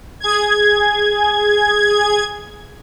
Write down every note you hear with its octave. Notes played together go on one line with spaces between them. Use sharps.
G#4 G#6